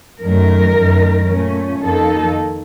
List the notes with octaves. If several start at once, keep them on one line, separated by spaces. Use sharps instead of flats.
F#2 D#3 F#3 A3 A#4
F#2 D#3 A3
A#2 A3 C#4
F2 D#3 A#3 D#4 A4